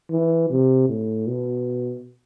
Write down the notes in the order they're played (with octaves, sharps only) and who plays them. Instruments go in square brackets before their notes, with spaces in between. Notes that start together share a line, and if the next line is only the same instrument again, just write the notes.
[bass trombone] E3
C3
A2
B2